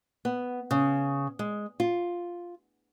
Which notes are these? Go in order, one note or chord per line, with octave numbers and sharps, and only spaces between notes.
B3
C#3
G#3
F4